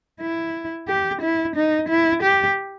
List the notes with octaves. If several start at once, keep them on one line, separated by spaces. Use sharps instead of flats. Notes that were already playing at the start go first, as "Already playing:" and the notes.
E4
G4
E4
D#4
E4
G4